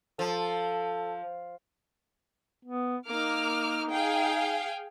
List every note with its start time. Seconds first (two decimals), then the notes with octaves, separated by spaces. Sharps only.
0.19 F3 A4
2.65 B3
3.07 A#3 D#4 D6 F6
3.91 G#4 F5 G5